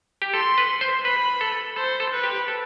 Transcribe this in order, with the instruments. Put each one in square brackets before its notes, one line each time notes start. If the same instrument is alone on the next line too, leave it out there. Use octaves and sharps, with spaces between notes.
[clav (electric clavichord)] G4
[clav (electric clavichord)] A4 [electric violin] C6
[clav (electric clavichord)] B4
C5
[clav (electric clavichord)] B4 [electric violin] B5
[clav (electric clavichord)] A4
[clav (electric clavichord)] A4 [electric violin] C5
[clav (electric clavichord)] A4
[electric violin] B4
[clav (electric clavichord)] G4
A4